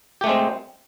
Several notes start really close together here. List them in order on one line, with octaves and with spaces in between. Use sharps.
G4 A3 G#3 C4